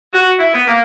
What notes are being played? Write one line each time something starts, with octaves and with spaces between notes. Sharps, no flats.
F#4
E4
B3
A#3